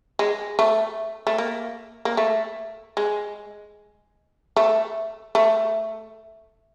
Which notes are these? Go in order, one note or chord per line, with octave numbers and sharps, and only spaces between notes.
G#3
A3
A3
A#3
A#3
A3
G#3
A3
A3